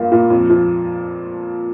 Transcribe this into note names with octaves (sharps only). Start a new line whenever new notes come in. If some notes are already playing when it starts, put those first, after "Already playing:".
Already playing: G2 A#3 F4
A#2
F2
F3